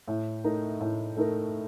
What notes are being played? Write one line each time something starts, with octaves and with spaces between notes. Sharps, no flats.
A2
A3 D#4 A#4
A2
A3 D#4 A#4